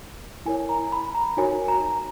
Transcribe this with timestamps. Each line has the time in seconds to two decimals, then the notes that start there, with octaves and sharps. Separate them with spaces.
0.45 E4 A#4 C#5 G#5
0.69 A#5
0.92 B5
1.15 A#5
1.37 D#4 F#4 A#4 C#5 G#5
1.68 A#5